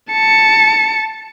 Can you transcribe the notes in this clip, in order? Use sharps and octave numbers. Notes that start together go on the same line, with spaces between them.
A5 C#7